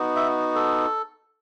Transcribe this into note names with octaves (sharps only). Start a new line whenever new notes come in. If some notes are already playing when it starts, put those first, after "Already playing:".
Already playing: B3 D#4 F#4
E5
A4